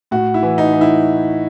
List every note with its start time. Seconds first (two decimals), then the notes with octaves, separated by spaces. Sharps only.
0.11 A2 F#4
0.34 E4
0.43 E3
0.58 D#4
0.73 E3
0.81 E4